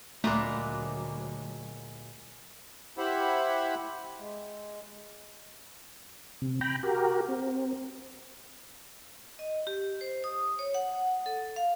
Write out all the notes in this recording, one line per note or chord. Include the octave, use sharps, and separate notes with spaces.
D2 A#2 F#3 G#3 A3 B4 D5 A#5
E4 G4 C5 E5 F#5 B5
G#3
C3
G5 A#5 B5
F#4 G4 A#4
C4
D#5
G4
C5
D#6
C#5
F#5
A4
F5